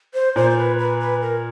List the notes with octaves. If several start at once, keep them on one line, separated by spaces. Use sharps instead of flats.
C5
A#2 C5
C5
B4
B4
B4
A#4